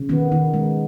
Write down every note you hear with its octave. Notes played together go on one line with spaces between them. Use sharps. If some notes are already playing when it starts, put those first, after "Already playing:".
Already playing: C#3
D#3 B3
D#3
G#3